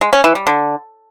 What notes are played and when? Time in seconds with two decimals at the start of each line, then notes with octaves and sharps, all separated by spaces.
0.01 G#3
0.13 C#4
0.24 E3
0.35 G3
0.47 D3